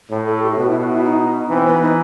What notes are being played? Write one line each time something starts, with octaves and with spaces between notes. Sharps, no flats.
A2
A4
G4
E4
B2 F#4
E4
F#4
E4
D#4
E3 C4
B3
D#4